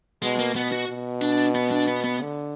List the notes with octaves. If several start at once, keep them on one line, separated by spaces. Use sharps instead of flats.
B2 G#3
A#3
B2 B3
F#4
B2
D4
B3
D4
B3
B3
D3